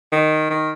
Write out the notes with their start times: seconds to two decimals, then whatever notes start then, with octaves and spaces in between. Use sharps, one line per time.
0.12 D#3
0.50 D#3